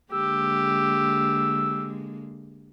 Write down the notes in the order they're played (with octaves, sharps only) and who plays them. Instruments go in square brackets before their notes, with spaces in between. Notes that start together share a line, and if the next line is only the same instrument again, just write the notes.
[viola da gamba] D3 G#3 A#3 [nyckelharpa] G4 [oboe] E6